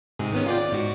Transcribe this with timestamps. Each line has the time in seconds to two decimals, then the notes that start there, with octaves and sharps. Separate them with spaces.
0.19 G#2 C3 G#4
0.32 D#3 B3 C#4
0.46 F4 D5 G5
0.59 D5 D6
0.72 G#2 F#4